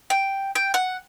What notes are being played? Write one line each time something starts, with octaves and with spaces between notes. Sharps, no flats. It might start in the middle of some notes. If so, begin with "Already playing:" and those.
G5
G5
F#5